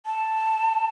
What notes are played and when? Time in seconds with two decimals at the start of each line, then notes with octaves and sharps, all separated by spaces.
0.06 A5